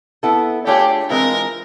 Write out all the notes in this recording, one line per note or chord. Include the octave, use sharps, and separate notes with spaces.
B3 E4 A4
A3 D4 F4 G4 G#4 C#5
E3 G#3 C4 F4 A#4